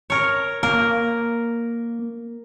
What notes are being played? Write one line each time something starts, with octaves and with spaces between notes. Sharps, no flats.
A#4 C#5
A#3 A#4